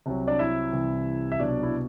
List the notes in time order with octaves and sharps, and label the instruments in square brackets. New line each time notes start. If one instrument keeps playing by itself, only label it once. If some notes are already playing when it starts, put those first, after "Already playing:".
[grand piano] C2 C3 F#3
D4 D5
E4 E5
C2 C3 E3 G3
E5
C2 B2 F#3 D4 D5
E4